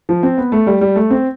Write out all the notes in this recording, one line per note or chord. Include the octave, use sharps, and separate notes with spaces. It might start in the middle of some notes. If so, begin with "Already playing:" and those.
F3
C4
B3
A3
G3
G3
A3
C4